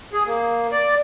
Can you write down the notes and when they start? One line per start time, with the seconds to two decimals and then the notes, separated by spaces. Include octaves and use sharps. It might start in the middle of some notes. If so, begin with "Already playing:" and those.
0.13 G#4
0.27 A#3
0.71 D5